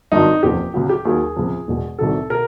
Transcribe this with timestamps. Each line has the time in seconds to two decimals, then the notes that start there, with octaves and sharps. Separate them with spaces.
0.12 G#1 G2 D#3 F#3 D#4
0.43 F#1 E2 C3 F3 G4
0.74 C#2 C#3 F#3
0.89 G4
1.05 D#2 D#3 F#3 G#4
1.36 C#2 C3 F3
1.68 E1 E2 B2
1.99 C2 C3 D#3 F#3 A4
2.30 B2 A#4